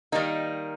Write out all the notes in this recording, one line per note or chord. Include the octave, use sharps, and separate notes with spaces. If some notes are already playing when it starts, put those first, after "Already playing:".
D#3 G3 A#3 D#4